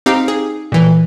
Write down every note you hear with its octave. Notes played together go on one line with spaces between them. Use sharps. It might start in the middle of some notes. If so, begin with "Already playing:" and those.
C4 D#4 G4 F5
G#4
A#2 E3